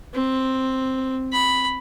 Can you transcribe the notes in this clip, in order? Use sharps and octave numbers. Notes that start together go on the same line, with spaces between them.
C4
B5